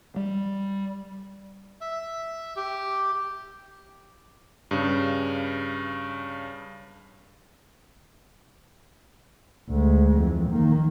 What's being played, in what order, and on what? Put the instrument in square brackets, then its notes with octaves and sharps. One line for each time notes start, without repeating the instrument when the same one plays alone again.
[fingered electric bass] G3
[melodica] E5
G4
[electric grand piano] G2 C#3
[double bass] D2 G#3
F2 E3
D#3 A#3